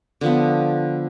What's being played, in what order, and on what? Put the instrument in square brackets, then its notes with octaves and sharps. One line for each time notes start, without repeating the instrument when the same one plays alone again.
[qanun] D3 F3 B3